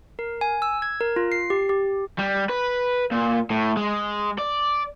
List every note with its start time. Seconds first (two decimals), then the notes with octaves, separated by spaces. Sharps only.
0.19 A#4
0.41 G#5
0.62 E6
0.82 G#6
1.01 A#4
1.16 F4
1.32 C7
1.50 G4
1.69 G4
2.19 G3
2.49 B4
3.11 A#2
3.50 A2
3.77 G#3
4.38 D5